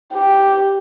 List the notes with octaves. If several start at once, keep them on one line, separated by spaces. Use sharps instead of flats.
G4